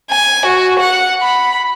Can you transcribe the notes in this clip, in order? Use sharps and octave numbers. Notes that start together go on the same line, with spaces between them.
G#5
F#4
F#5
B5